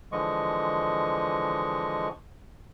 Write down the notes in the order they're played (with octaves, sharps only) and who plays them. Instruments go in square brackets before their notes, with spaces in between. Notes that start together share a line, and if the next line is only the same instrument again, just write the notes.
[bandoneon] D3 E3 F3 G#3 D#5 C#6